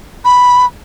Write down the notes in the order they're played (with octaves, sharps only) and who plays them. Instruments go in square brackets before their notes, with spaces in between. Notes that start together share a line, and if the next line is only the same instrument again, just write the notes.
[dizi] B5